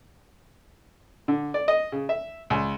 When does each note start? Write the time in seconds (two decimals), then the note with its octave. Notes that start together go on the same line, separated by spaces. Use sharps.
1.28 D3
1.54 D5
1.68 D#5
1.92 C#3
2.09 E5
2.50 C#2